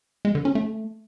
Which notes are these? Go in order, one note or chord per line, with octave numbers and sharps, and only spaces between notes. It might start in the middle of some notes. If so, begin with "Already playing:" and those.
G#3
D3
C#4
A3